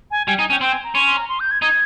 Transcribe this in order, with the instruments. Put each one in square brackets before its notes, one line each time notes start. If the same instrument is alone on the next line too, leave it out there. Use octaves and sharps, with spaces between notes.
[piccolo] G#5
[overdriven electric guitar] G3 [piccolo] G#5
[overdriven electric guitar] D#4 [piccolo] G#5
[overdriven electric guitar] C#4 [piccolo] G5
[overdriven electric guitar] C4 [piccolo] G5
[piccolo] G#5
A#5
[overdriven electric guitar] C#4 [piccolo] C6
[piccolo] C6
A#5
C6
G6
G#6
[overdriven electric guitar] D#4 [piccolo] G#6